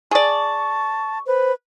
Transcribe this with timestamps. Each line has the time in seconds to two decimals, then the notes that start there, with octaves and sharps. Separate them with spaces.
0.11 G#4 D5 A5 C#6
1.27 B4 C5